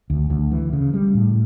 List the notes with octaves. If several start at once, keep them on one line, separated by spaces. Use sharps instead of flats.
D2
D2
E3
C#3
G3
A2